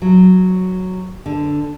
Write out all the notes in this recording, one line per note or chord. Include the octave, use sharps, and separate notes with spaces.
F#3
D3